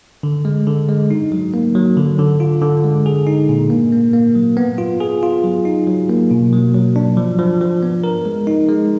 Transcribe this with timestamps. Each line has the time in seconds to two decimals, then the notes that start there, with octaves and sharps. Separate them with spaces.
0.23 D3
0.45 G#3
0.67 D3
0.89 G#3
1.11 D#4
1.32 F#3
1.54 A#3
1.75 F#3
1.97 D3
2.19 D3
2.40 F4
2.62 D3
2.84 G#3
3.06 G#4
3.27 D#4
3.49 A#2
3.70 A#3
3.92 A#3
4.13 A#3
4.35 F#3
4.57 B3
4.78 F4
5.00 G#4
5.23 F4
5.44 F#3
5.65 D#4
5.87 F#3
6.09 A#3
6.31 B2
6.52 F#3
6.74 F#3
6.96 D4
7.17 F3
7.39 F3
7.61 F3
7.83 B3
8.04 A#4
8.25 G#3
8.47 D#4
8.69 G#3